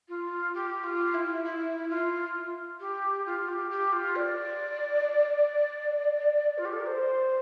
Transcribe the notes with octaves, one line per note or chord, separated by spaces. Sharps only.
F4
G4
F4
E4
E4
F4
G4
F4
G4
G4
F4
D5
F4
G4
A4
A#4
C5